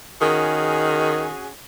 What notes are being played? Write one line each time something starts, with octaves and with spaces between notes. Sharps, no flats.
D#3 C#4 F#4 G#4